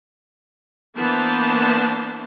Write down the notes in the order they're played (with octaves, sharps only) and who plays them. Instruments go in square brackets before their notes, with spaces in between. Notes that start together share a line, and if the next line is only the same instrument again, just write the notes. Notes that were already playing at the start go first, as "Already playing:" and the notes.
[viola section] E3 A#3 B3 D4 C5 A5